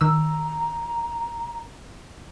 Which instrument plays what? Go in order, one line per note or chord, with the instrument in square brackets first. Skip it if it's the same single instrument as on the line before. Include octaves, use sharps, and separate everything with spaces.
[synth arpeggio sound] D#3 E6 [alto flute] A#5